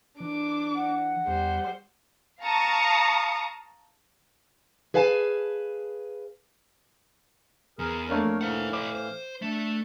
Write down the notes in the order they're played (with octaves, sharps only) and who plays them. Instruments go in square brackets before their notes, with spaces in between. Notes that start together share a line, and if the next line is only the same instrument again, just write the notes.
[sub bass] E3 [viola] D4 [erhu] D6
[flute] F#5
[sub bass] E2 [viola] G3 [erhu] C5
[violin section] F5 A5 A#5 C#6 D#6
[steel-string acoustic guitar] G#4 B4 F5 G#5 A5
[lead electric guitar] E2 [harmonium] G#4 A#4
[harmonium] F2 A#4 C#5 [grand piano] A3 A#3 D4
[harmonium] A2 E3 F5 [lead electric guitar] C5 F#5
[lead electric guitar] B4 C#5 [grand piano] D6
[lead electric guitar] C5
[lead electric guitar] A3 [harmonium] D4